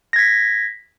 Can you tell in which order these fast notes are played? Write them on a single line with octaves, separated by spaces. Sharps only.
A#6 G#6 B6